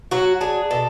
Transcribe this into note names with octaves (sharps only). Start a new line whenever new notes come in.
F#3 F#4
D4 G#4
B2 A4